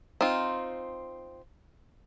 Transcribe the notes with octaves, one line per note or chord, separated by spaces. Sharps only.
C4 D#4 F4